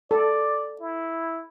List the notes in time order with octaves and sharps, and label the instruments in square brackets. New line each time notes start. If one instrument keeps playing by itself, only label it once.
[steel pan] A4 [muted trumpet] D5
[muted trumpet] E4